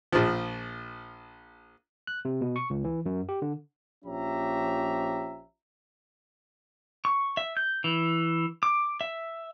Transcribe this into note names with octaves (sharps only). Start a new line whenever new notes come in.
A#1 F3
F#6
C3
B2
C#6
C#2
E3
F#2
G4
D3
A#1 F3 C#4 G4 E5 A#5
C#6
E5
G6
E3
D6
E5